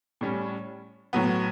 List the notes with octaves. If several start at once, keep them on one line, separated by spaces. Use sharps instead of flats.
A2 G3 C#4
A2 F#3 B3